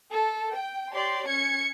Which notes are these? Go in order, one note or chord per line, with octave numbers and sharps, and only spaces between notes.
A4
G5
G4 C#5 D5 C6
C#4 G#6 C#7